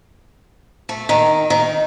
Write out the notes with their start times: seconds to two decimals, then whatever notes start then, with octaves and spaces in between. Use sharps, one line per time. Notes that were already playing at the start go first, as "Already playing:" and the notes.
0.89 A3
1.09 D#3
1.50 D#3